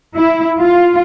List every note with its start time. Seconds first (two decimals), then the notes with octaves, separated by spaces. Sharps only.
0.17 E4
0.61 F4